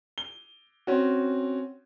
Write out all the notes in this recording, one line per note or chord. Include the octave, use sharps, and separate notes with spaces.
G7
C4 C#4 F#4